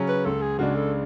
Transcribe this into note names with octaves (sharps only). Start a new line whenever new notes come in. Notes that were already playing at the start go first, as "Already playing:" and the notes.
Already playing: C#3 F#3 C#4
B4
C#2 A4
G#4
C#3 G#3 D4 F#4
A4